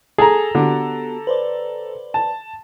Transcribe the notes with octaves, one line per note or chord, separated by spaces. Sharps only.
G#4 A4 A#5
D3 B3 F#4 G4
B4 C5 D5
A5